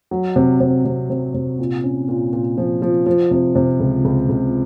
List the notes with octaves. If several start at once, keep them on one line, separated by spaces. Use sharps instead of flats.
F#3
C3
C3
C3
C3
C3
A#2
C#4
A#2
A#2
F3
F3
F3
C3
C3
C#2
C#2
C#2